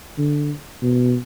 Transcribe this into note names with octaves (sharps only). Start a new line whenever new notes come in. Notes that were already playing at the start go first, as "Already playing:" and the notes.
D3
B2